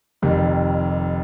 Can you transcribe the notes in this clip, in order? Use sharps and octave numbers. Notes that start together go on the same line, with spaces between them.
F1 F2 C3 D#3 G3